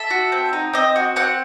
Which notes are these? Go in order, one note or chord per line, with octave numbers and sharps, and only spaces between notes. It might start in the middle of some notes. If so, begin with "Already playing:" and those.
Already playing: A4 E5
F#4
C4
D#4
C4 D#5
F#4
C4 F#5